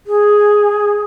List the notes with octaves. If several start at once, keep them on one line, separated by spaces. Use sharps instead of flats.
G#4